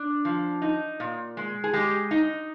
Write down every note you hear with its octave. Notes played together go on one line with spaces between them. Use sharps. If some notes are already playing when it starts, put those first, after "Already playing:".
Already playing: D4
F3
D#4
A#2
G#3
G#4
G#3 G4
D#4